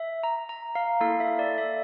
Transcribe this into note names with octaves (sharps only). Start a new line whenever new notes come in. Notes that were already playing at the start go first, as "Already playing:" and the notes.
Already playing: E5
A#5
A#5
F5
A#3 E4 A4 F5
E5
D5
E5